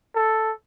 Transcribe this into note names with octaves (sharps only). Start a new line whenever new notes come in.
A4